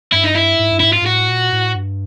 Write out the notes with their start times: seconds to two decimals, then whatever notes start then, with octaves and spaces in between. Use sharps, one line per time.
0.12 G2 E4
0.24 D#4
0.35 E4
0.59 G#2
0.71 G2
0.80 G#2 E4
0.93 F4
1.02 G#2
1.06 A2 F#4
1.29 A#2
1.52 A2
1.75 G2